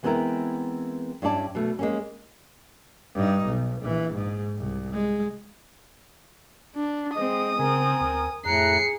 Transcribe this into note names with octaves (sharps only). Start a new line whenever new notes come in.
E3 G#3 B3 C4 E4 A#4
G2 C#4 E4 D5 A5
B2 A3
G#3 A#3 C#4
G2 D#4
B1
A#1 E3
G#2
C2
G#3
D4
G#3 C4 D#5 D#6
C#3 C4 A#4 G#5
D2
F2 A2 G#4 A#5 F#6 C7 C#7